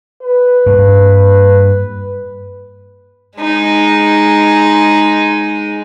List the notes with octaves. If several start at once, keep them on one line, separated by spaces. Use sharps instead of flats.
B4
G2 A#3
G#3 D#4